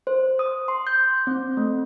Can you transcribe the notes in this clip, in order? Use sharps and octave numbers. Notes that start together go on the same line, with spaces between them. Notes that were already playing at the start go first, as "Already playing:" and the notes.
C5
D#6
C6
G6
C4
A3